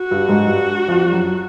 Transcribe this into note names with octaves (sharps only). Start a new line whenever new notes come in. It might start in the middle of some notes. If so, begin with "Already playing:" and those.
Already playing: F#4
G2 G3
G#2 G#3
F#3
G2 G3
F2 F3
G3
F#2 F#3